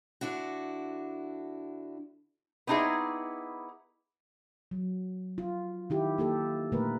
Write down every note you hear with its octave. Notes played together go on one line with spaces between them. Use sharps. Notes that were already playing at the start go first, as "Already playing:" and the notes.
D3 D4 E4 F#4
B3 C4 D#4 E4 G#4 D5
F#3
F4
D#3 E4 G4
A#3 G4 A4
A#2 D3 A3 A#3 A#4 B4